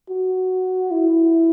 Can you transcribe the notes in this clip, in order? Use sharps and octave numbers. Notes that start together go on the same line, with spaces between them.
F#4
E4